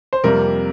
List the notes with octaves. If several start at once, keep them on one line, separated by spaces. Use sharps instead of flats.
C5
F2 C3 G3 A#3 A#4